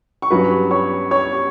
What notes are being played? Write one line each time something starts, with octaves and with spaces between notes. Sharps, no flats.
C#6
G2 F#3 C#4 B4 B5
C#5 C#6
C#5 C#6